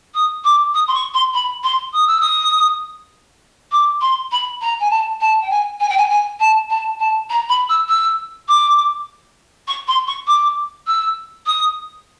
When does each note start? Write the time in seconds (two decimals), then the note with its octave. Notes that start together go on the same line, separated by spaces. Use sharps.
0.14 D#6
0.44 D6
0.74 D#6
0.88 C6
0.94 C#6
1.14 C6
1.34 B5
1.63 C6
1.93 D#6
2.07 E6
2.20 D#6
3.72 D6
4.01 C6
4.32 B5
4.61 A#5
4.80 G#5
4.90 A5
5.21 A5
5.42 G5
5.50 G#5
5.80 G#5
5.89 G5
5.98 G#5
6.10 G#5
6.40 A5
6.70 A5
7.00 A5
7.30 A#5
7.49 B5
7.69 E6
7.88 E6
8.48 D6
9.67 C#6
9.87 C6
10.07 C#6
10.27 D6
10.87 E6
11.46 D#6